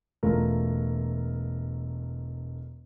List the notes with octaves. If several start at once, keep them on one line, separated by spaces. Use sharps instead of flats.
E1 A3 F4 A#4